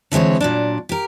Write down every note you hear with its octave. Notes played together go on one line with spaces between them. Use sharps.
D3 E3 G#3 C4 C#5
A#2 F#3 D4
G4 A#4